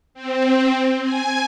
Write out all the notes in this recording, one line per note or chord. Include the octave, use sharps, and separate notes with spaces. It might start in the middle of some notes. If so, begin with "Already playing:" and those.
C4
G#5